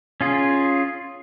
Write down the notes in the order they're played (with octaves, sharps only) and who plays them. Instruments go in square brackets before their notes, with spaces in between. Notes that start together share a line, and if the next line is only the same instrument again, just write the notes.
[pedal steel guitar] C#4 F4 G#4